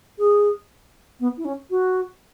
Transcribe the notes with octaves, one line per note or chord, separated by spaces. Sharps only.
G#4
B3
E4
C#4
F#4